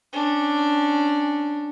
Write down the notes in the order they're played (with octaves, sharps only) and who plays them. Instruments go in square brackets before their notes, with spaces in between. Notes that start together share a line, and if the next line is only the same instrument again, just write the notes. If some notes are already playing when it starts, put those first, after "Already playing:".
[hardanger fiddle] C#4 D4